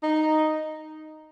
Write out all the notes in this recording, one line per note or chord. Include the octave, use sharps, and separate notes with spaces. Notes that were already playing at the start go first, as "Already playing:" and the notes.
D#4